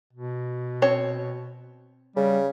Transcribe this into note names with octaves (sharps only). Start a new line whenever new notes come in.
B2
C4 C#5
C#3 G3